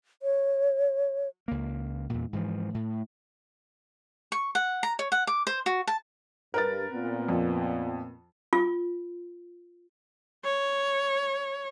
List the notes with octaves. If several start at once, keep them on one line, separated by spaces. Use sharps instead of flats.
C#5
C#2 A#3
E2 A#2
G#2 E3 F3
A2
C#6
F#5
A#5
C#5
F#5
D6
C5
F#4
A5
G2 A#4 B4 A6
A#2 B3 C4
F2
F4
C#5